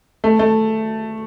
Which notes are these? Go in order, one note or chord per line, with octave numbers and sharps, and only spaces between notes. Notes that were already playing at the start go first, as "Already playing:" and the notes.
A3
A3